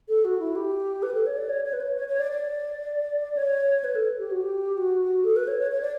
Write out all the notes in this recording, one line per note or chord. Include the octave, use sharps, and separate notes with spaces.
A4
F#4
E4
G4
B4
A4
C#5
D5
C#5
C#5
B4
C#5
C#5
C#5
D5
D5
C#5
B4
A4
G4
F#4
G4
F#4
A4
B4
C#5
C#5
C#5
D5